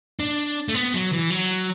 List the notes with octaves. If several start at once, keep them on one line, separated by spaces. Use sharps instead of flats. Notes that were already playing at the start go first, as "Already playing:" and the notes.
D4
A3
B3
F#3
E3
F#3